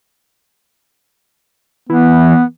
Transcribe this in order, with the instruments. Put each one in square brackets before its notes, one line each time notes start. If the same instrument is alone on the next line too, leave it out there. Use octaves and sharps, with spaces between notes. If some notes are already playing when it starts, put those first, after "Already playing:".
[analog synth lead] E3 [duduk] B3